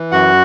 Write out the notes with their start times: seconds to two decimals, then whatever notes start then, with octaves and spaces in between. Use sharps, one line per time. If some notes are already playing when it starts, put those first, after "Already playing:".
Already playing: E3
0.12 F#2 F#4 F#5